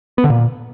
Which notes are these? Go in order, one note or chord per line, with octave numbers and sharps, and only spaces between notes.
B3
D3
A#2